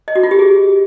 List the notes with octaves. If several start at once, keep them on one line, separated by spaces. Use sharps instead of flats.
D#5
F#4
F4
G4
G#4